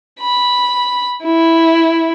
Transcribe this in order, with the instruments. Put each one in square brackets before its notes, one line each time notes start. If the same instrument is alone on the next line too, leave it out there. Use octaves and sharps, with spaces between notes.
[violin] B5
E4